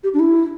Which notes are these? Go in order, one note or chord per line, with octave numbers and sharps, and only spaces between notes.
G4
D4
E4